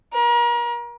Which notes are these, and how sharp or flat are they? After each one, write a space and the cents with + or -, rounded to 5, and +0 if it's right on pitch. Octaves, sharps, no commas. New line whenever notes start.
A#4 +35